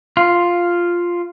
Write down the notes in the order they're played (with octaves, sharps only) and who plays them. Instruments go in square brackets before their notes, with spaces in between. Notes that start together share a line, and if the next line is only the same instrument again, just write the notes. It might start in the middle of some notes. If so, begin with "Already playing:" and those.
[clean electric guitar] F4